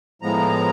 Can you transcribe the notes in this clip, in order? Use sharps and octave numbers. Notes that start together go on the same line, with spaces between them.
A2 F3 G#3 B3 A#5